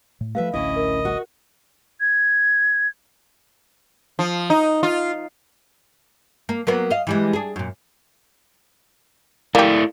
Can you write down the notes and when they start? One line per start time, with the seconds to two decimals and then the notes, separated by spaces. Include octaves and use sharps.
0.21 A2
0.35 F3 A3 A4 B4 E5 F5
0.54 A1 D2 C#4 E4 D#5
0.76 A#4
1.05 F#4
2.00 G#6
4.19 F3
4.50 D#4
4.83 F4
6.49 A#3
6.67 F#3 A#3 B3
6.91 D#5 F5
7.07 E3 G3 G#3
7.33 D4 G#4
7.56 F#2 A#2
9.55 A3 A#3 E4 G4 D5